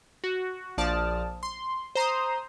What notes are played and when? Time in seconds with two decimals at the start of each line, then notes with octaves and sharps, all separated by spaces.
0.24 F#4
0.77 A#1 F3 D5 A5 D#6 F6
1.43 C6
1.95 C5 A#5 C6 D#6